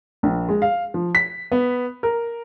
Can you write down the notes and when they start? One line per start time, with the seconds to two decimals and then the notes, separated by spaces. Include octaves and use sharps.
0.23 A#1
0.49 G#3
0.62 F5
0.94 F3
1.15 B6
1.52 B3
2.03 A#4